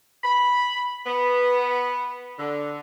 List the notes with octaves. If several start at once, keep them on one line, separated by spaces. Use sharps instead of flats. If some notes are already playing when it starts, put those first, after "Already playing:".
B5
B3
D3